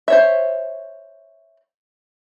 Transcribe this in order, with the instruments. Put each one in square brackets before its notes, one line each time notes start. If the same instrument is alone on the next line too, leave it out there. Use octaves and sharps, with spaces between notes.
[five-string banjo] C5 C#5 E5